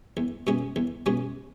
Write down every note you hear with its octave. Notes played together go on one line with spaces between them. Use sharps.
E2
B2 G#3 C#4
E2
B2 G#3 C#4